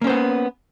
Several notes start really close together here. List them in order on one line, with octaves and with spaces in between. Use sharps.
A#3 C#4 C5 B3